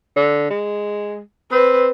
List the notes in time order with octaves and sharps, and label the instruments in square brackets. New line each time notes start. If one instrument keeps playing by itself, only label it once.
[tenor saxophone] D3
G#3
[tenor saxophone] C4 [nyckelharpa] B4